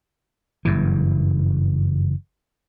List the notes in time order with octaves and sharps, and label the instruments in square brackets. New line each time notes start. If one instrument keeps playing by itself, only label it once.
[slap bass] F#1 G2 E3